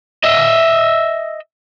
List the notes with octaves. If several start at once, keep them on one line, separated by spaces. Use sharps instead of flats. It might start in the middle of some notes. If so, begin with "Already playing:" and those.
D#5 E5